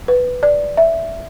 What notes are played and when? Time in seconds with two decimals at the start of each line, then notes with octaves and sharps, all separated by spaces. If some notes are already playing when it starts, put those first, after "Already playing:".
0.08 B4
0.43 D5
0.77 E5